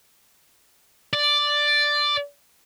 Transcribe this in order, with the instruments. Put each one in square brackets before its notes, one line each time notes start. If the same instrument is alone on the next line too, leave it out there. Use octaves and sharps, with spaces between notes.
[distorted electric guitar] D5